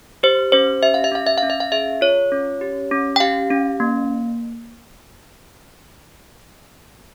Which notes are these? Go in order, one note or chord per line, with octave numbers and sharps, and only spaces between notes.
G4 C5
C#4 C5
G4 E5
F5
E5
C#4 F5
E5
C#4 F5
E5
F5
G#4 E5
F4 C#5
C#4
G4
C#4
G5
G4 F5
C#4
A#3